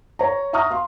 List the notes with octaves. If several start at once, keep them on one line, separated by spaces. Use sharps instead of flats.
C#5 A#5
E5 F#5 A#5 C#6 D#6 F6
F5 C6